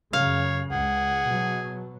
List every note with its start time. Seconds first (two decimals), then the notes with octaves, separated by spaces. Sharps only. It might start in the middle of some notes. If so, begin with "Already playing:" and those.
0.13 F#2 C#3 C#5 F5
0.71 C#2 G#4 F#5
1.28 B2 F#3